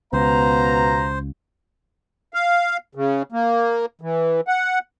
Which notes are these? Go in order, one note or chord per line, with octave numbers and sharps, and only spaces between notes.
C#2 B2 B3 C5 F5 A#5
F5
C#3
A#3
E3
F#5